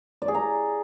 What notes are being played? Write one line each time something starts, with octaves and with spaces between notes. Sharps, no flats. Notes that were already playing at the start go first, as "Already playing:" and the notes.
D5
G#4
A#5